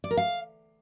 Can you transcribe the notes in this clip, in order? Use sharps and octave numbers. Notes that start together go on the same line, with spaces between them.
D5
A#4
F5